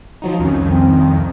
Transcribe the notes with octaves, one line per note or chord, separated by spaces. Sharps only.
F3 F#3 D#4
C2 F2 D#3 C#4
C4